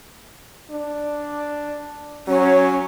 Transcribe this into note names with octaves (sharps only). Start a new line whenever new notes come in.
D4
F#3 C#4